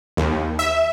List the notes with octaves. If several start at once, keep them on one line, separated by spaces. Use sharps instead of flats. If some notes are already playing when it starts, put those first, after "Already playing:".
D#2
E5